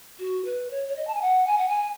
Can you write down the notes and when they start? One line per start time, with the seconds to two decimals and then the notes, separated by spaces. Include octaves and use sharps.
0.19 F#4
0.45 B4
0.70 C#5
0.88 C#5
0.96 D#5
1.07 A5
1.15 G#5
1.22 F#5
1.47 G#5
1.58 F#5
1.68 G#5